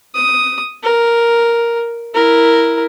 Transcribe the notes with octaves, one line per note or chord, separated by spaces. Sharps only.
D#6
A#4
E4 A#4